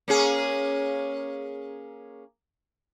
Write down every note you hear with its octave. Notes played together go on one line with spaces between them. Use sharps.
A#3 C#4 G#4